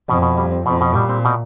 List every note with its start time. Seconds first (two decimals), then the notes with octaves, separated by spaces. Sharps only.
0.09 F2 B2
0.22 B2
0.37 G3
0.52 C4
0.66 F2 B2
0.81 B2
0.95 A#2 G3
1.09 C4
1.25 B2